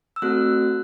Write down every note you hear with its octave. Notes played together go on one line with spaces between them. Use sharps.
E6
A3 C4 F#4 A4 F#6